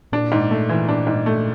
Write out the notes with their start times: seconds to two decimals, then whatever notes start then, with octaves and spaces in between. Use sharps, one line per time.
0.12 A#2 D4
0.32 G#2
0.51 A3
0.69 E3
0.89 D4
1.07 G#2
1.26 A3